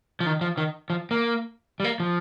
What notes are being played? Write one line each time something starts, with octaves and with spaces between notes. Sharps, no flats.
F3
D#3
F3
D#3
F3
A#3
G3
A#3
F3